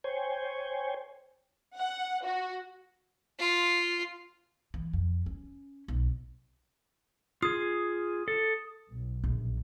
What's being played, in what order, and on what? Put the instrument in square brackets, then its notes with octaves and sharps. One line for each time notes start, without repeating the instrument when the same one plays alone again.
[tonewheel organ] C5 C#5 G5 G#5
[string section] F#5
F#4
[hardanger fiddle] F4
[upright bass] E3
F2
C#4
B1
[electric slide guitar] F4 G#4 [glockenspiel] D#6
[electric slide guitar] A4
[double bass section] B1
[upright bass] A#1